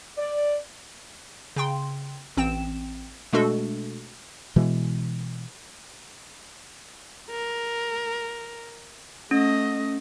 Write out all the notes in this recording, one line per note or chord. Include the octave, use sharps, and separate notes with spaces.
D5
C#3 G5 C6
A1 C4 G5 E7
B2 G#3 A3 D4 F#4 A4
B2 E3 G#3
A#4
A3 C#4 D#5